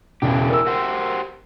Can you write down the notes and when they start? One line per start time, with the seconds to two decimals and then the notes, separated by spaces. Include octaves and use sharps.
0.22 E1 C#3 E3 D4 G4
0.50 A#4 E6
0.67 F#4 G4 C5